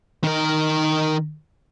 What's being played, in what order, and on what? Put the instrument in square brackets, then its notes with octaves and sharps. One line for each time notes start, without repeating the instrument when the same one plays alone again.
[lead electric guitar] D#3 A#4